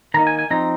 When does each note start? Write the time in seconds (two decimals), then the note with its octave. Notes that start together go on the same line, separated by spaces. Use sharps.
0.14 D#3 A#3 D#4 A#5
0.27 G#5
0.39 G#5
0.51 F3 C4 D#4 A#5